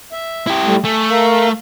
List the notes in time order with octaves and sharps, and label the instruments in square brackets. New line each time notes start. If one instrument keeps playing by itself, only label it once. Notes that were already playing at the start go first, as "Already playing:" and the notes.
[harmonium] E5
[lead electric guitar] E4 G4
[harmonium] G3 A3
[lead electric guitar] A3 [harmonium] G#5
[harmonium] A#4 F5